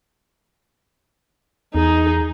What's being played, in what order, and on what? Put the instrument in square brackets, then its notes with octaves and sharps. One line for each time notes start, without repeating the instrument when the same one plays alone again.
[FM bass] E2 [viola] D#4 G#4